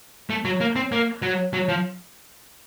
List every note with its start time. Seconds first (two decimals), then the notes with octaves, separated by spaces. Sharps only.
0.30 A3
0.45 F#3
0.60 A#3
0.76 C4
0.92 A#3
1.22 F#3
1.53 F#3
1.69 F3